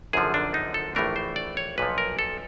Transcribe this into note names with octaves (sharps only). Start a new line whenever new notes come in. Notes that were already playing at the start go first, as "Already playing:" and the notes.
G#1 F#2 D3 F3 G#4
D4
D#4
A4
A#1 A2 E3 A3 D4 A#4
C5
D5
C#5
B1 A#2 F3 B4
A#4
A4